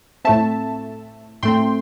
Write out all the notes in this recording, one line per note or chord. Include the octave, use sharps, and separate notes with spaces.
A2 A3 C4 E5 A5
A2 A3 C4 G5 C6